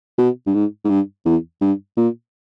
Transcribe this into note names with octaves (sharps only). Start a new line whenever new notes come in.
B2
G2
G#2
G#2
G2
E2
G2
A#2